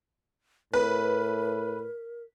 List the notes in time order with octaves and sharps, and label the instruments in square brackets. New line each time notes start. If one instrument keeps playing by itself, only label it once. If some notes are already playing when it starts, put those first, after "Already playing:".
[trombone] A2 [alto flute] A#4 [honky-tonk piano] B4